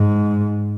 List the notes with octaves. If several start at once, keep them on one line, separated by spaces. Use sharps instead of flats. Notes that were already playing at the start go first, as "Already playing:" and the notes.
Already playing: G#2